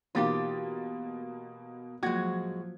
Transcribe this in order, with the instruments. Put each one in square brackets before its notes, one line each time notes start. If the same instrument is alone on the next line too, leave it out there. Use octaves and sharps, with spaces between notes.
[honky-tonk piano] B2 A#3 A6 [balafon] E3 D#4 F5 [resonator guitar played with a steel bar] F4 G4
[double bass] F3 F#3 [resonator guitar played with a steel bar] G#3 F#4 [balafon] A#3 F4 [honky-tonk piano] G#6